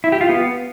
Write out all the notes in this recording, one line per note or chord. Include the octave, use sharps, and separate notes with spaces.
E4
G4
F4
B3